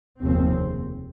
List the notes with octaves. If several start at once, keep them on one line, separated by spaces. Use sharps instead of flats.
F1 D#2 C#3 C4